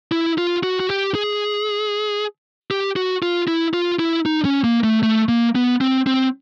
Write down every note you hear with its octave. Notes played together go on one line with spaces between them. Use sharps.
E4
F4
F#4
F#4
G4
G#4
G4
F#4
F4
E4
F4
E4
D#4
C#4
A#3
A3
A3
A#3
B3
C4
C4